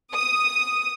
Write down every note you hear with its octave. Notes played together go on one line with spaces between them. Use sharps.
D#6